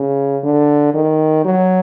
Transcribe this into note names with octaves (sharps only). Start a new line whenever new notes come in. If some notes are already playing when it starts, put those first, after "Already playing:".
Already playing: C#3
D3
D#3
F#3